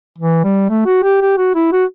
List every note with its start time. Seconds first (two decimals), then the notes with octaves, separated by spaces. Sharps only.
0.18 E3
0.44 G3
0.69 A3
0.86 F#4
1.03 G4
1.21 G4
1.37 F#4
1.55 E4
1.72 F#4